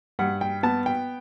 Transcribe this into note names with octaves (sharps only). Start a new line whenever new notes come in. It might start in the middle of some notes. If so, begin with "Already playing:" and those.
G2 F#5
G5
B3 A5
G5